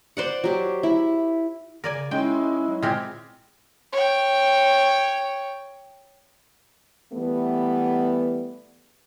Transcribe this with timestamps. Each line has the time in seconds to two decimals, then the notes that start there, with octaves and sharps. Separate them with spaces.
0.17 C5 D5 F#5
0.44 F#3 G4
0.83 E4
1.84 C#3 A#4 D5 G#5
2.11 G#3 C#4 D#4 E4 G5 C6
2.68 F#3
2.82 A#2 G#3 C4 G4 F6 G#6
3.93 C#5 G5
7.13 E3 G3 A3 B3